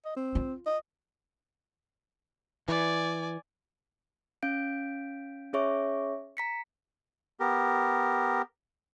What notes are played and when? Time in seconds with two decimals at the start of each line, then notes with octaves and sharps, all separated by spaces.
0.05 D#5
0.17 C4
0.35 F4
0.66 D#5
2.68 E3 D5 G#5
4.43 C#4 F5 G6 D7
5.53 C#4 G#4 C#5 E5 C#6 D6
6.37 A#5 B6 C#7
7.40 B3 G4 A#4